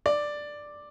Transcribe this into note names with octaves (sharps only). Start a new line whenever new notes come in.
D5